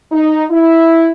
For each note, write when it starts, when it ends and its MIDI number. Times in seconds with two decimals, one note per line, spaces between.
0.11 0.44 63
0.50 1.10 64